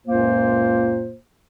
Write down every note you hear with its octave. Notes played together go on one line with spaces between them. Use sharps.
C#2 F#2 A#2 A#3 F4 C5